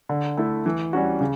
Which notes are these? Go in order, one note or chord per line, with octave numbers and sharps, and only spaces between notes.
D3
A3 E4
E3
G3 C#4 F#4
C#3